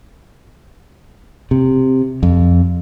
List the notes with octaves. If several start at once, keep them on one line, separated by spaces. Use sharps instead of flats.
C3
F2